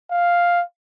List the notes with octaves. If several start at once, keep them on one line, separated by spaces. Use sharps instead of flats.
F5